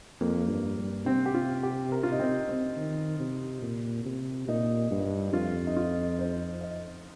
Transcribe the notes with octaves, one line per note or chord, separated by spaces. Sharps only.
F2 A#3
G2
G2
C3 C4
G4
F4
G4
A#4
F4
D#4
C4
C4
D#3
C3
A#2
C3
A#2 D#4
G2
F2 F4
D#4
F4
C5
D#5